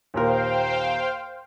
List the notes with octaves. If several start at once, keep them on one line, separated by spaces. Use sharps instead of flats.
D#2 A#2 A#4 C5 F5 G5